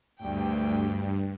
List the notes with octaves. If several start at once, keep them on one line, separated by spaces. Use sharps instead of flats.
D2 G2 G5